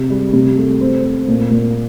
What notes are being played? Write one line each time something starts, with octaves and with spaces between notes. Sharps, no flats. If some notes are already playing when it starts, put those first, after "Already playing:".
Already playing: C3
G3
C3
A3
C4
C4
A#2
A#2